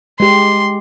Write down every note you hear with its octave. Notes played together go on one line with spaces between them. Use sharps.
G#3 G4 C6